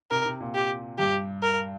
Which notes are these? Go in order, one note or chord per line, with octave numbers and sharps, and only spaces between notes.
C3 A#4
C3
A#2
G4
G2 G4
A#4